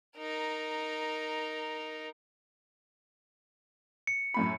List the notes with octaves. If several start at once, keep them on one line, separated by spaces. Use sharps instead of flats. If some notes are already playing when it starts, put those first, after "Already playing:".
D#4 A#4
C#7
F#2 A2 B5